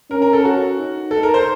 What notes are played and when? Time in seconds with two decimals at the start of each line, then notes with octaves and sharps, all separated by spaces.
0.11 C#4 A#4
0.22 A#4
0.33 A4
0.45 F#4
0.77 D#4
1.11 A4
1.23 A#4
1.34 C5